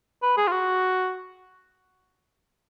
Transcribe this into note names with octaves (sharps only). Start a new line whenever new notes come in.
B4
G#4
F4
F#4